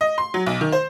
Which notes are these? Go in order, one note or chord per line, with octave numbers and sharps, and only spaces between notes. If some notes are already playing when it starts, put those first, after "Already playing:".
D#5
C6
F#3
B1
D#3
C5